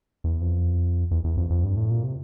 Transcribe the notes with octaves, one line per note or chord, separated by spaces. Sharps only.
E2
F2
E2
E2
F2
F2
G2
A2
A#2
C3